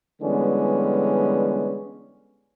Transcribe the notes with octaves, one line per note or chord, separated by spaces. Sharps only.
D3 E3 G3 G#3 B3 C#4